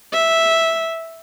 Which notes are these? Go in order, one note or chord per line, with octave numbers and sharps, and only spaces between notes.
E5